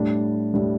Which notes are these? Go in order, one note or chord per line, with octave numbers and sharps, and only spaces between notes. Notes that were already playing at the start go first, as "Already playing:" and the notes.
Already playing: A2 G3 D4
A2 G3 D4